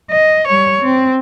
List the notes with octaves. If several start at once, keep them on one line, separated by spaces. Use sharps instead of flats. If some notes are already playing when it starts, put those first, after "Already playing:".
D#5
G3 C#5
C4